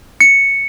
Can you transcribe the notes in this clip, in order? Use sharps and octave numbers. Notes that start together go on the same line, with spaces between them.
C#7